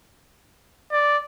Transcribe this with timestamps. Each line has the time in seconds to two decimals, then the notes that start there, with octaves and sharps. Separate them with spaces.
0.92 D5